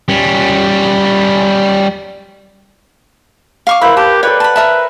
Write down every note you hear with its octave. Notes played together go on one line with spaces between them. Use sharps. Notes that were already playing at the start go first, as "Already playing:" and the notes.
G3 C#4
F5 C#6 D6
A#3 E4 B4 C5 B5
G4 A5
A4 B4 C#5 D5 G5
A5 B5
A#4 E5 A5